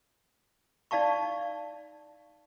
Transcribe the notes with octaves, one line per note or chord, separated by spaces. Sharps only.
D#4 D5 F5 A5 C#6